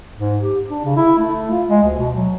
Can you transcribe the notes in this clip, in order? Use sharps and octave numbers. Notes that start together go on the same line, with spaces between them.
G#2
G4
D4
C#3
E4
A3
F4
G#3
D2
B2
F#3